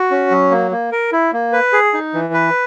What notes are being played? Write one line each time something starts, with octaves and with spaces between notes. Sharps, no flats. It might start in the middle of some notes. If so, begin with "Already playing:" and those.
Already playing: F#4
C#4
F#3
A#3
A#3
A#4
E4
A#3
B4
G#4
D#4
E3
B4